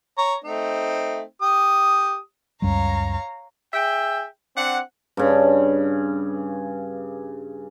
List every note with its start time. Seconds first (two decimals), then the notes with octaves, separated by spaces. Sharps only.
0.18 C#5 A#5
0.44 A3 C4 D#4
1.42 G4 D#6
2.62 C#2 F#2 G3 C#5 F5 A#5
3.74 G#4 E5 G5
4.57 C4 D4 F#5
5.17 G2 C#3